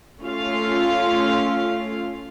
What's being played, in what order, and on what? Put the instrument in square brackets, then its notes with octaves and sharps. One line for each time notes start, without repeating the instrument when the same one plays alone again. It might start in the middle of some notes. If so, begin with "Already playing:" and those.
[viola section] A3 C#4 F4 F5